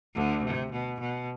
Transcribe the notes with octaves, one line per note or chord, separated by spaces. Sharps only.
D2 D3
C3
B2
B2